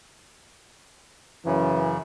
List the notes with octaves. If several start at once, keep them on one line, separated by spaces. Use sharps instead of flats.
F#2 C#3 E3